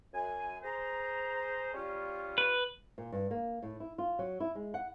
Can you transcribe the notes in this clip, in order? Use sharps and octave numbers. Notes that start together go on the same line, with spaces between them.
F#2 G#5
G#4 C5 A#5
G3 C#4 F4
B4
A#2
G2
A#3
A2
E4
F4
F#3
E4
G#3
F#5